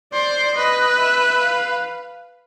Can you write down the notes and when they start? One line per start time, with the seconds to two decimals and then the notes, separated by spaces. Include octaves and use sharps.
0.13 C5 D5
0.56 B4 D#5
1.00 E5
1.43 F5